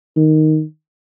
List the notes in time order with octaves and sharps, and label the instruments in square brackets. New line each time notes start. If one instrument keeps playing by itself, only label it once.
[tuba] D#3